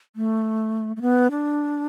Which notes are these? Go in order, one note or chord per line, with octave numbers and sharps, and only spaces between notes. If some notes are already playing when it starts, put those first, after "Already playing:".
A3
A3
B3
D4